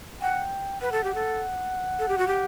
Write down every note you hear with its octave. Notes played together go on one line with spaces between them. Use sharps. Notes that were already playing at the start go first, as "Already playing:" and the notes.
F#5 G5
B4 F#5
A4
G4
A4
A4
G4
F#4
G4